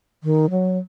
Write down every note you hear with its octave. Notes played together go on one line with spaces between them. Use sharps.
D#3
F#3